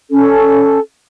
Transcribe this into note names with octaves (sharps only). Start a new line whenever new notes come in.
C#4 A4